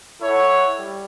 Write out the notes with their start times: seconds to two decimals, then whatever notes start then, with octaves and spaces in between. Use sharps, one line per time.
0.20 E4 A4 C#5 F#5
0.77 G3